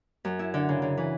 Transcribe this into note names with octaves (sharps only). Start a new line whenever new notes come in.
F#2
E4
D3
C#3
C#3
E3